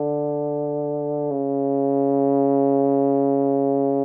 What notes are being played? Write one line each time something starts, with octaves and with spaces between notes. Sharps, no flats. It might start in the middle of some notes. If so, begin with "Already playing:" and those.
Already playing: D3
C#3